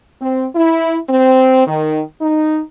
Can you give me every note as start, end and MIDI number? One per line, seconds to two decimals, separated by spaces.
0.20 0.46 60
0.55 0.97 64
1.09 1.63 60
1.67 2.00 51
2.21 2.60 63